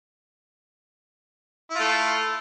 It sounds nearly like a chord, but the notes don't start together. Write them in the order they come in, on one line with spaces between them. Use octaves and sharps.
E4 F4 A3